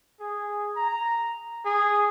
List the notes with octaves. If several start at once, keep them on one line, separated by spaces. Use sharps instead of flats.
G#4
A#5
G#4